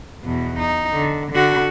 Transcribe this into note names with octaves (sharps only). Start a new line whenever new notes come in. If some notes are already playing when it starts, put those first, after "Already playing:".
E2 B2
D#4
D3
D3 F#4